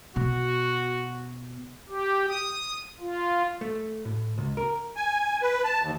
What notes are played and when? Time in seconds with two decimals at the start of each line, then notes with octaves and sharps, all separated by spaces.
0.16 B2 F#4
1.89 G4
2.27 D#6
3.00 F4
3.61 A3
4.05 A2
4.38 C#2
4.57 A#4
4.96 G#5
5.42 B4
5.64 A5
5.81 D#2